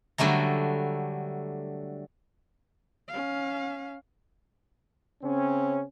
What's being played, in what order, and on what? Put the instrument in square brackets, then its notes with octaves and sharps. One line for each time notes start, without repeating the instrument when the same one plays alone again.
[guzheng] D3 F#3 G3 A3 A#5
[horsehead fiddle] C#4 F5
[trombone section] C#3 C4 C#4